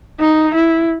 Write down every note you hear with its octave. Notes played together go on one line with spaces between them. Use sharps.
D#4
E4